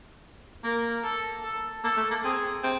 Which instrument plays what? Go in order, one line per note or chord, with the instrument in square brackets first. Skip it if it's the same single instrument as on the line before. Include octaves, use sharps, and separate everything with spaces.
[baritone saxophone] A#3 [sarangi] A#4
[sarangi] A4
A4
[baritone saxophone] A#3 [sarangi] A4
[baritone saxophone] A3
A#3
[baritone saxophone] C4 [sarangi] G#4
[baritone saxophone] C4